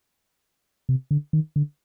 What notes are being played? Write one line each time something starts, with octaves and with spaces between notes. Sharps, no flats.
C3
D3
D#3
D3